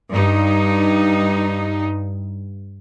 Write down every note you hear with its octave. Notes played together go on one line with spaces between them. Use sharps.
G2 D#4